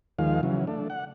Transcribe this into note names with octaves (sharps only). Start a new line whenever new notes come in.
D#2 D#3 F3 G#3 F5
C#3 E3 F#3
A3 D4
F#5